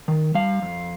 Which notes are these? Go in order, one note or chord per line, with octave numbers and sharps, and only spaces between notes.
D#3
G3 F5
F2